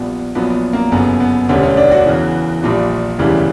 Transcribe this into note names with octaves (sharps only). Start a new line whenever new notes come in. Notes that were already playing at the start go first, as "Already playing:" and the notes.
Already playing: A#1 A#2 G3 B3
A#1 A#2 F#3 B3
A#3
G1 F#2 C#3 B3
B3
E1 D2 D3 G3 C#4
C#4
D4
F#4
E2 C#3 E3
A#1 A#2 G3
E1 D2 C#3 E3 G3